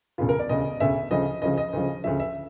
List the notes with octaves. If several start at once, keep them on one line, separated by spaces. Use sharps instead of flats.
E1 D2 C#3 F4
A#4
D5
E1 D2 C#3 D#5
E1 D2 C#3 E5
D2 C#3 F3 D#5
D2 C#3 F3 D#5
D#5
D2 C#3 F3
D2 C#3 F3 E5
E5